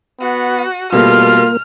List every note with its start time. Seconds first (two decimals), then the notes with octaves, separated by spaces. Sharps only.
0.21 B3 F#4
0.93 B2 G3 A3 A#3 F4 A#4 F6